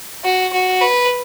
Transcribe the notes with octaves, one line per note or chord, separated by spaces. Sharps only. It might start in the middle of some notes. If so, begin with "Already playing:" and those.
F#4
F#4
B4